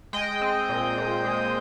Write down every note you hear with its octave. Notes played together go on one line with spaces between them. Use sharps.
G#3 D#5 G5
C4
A#2
A#2
G#3